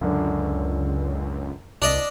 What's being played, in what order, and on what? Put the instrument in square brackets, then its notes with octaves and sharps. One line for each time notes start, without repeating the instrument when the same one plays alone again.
[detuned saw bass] C#2 [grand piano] F#2 D3 D4
[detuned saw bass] C2 [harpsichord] D4 D5 D#5